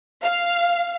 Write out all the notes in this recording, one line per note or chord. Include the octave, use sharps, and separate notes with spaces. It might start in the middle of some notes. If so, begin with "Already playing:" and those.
F5